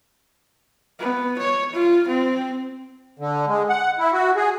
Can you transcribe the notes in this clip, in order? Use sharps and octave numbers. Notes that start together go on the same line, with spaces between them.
B3
C#5
F4
C4
D3
G#3
F#5
E4
F#4
G#4